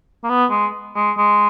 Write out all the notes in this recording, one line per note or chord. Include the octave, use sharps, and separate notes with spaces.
A#3
B3
G#3
G#3
G#3